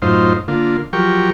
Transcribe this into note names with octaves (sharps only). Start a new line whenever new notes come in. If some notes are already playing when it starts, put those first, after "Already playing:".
F#2 A2 D#4 F4 C5
D3 A#3 F4
F3 F#3 G4 A#4 G5 C#6